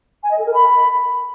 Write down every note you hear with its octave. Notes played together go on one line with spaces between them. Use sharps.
G#5
D#5
A4
A#4
B5